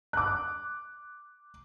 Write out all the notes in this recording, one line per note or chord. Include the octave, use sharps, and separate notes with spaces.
D6 F#6